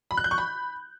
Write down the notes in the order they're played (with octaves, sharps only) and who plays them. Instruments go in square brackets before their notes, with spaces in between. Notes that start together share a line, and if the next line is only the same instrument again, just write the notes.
[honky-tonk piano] B5
F#6
G6
C#6
B5